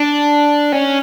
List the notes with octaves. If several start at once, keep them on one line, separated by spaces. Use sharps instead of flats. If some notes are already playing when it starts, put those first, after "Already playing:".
Already playing: D4
C#4